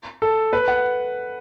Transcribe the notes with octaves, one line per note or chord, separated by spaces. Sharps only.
A4
B4
F#5